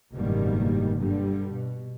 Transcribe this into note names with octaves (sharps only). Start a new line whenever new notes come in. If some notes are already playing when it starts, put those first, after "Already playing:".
F#1 G#2 B2 D#3 G3 A#3
G2 D3 G3
B2